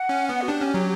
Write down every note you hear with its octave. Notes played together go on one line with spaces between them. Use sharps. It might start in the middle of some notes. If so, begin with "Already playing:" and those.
Already playing: F#5
C#4
B3
F#4
D4 G4
C#4
F#3